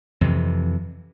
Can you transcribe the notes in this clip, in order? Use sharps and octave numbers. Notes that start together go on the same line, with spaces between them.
F2 C3 E3